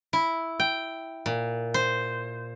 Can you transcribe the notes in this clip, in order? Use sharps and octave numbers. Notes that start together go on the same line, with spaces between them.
E4
G5
A#2
C5